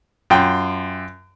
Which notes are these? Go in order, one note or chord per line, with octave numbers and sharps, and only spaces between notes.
F#2 F4 G5